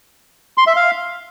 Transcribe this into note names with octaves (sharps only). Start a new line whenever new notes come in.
C6
E5
F5